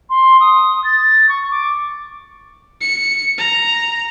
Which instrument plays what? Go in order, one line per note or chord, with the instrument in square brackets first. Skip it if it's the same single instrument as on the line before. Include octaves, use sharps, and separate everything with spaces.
[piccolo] C6
D#6
A6
C#6
D6
[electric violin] C#7
A#5